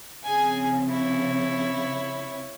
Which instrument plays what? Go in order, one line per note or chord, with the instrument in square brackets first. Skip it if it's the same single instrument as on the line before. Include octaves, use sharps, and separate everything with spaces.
[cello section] C#3 F3 C4 [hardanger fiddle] G#4 G#5
[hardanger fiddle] E4 C#5